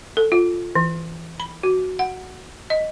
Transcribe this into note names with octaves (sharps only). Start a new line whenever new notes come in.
A4
F4
E3
B5
F#4
F#5
D#5